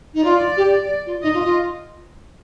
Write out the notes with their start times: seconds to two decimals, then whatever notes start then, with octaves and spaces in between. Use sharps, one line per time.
0.14 D#4
0.24 F4 D5
0.57 G4
1.06 F4
1.22 D#4 D#5
1.34 F4
1.44 F4